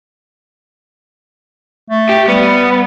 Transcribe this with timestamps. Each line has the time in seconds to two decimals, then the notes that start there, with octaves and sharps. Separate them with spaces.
1.90 A3
2.09 G4
2.28 G3 B3